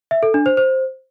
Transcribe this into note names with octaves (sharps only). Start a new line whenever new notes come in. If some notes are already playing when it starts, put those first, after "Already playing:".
E5
A4
D4
C5
C5